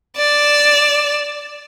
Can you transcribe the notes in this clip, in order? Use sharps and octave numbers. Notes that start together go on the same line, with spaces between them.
D5 E7